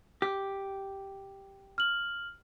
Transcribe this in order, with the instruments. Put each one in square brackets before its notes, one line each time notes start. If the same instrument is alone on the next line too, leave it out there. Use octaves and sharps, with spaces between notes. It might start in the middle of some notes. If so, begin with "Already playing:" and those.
[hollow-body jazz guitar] G4
[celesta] F6 F#7